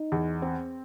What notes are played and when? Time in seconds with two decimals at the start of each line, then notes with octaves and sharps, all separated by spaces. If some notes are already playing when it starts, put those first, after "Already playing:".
Already playing: D#4
0.12 E2
0.42 C4